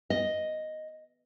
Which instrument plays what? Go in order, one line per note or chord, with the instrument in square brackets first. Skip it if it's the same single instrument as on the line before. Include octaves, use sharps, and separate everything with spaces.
[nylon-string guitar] D#5